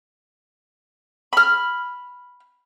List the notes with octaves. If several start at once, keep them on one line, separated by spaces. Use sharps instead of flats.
B5 F6